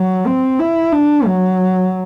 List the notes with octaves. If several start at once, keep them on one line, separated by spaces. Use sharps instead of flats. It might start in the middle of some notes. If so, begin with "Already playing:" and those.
Already playing: F#3
C4
E4
D4
F#3